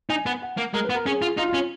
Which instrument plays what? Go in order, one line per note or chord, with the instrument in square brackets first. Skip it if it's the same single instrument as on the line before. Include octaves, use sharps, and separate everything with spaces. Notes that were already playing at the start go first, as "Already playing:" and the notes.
[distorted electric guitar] D#4 [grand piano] G#5
[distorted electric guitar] B3
[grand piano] F#5
[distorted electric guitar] A#3
[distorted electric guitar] G#3 [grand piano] A#4
[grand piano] B4
[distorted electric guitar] B3
[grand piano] A#4
[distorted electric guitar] C#4 [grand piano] G#4
[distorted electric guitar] F4
[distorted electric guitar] D#4 [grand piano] F4
[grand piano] F4
[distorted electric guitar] C#4